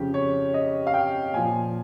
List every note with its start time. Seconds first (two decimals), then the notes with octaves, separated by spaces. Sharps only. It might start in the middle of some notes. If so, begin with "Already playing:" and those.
Already playing: F2 C#3 F3 G4
0.14 C#5
0.54 D#5
0.87 F5
0.94 G5
1.33 A#2 F3 G#5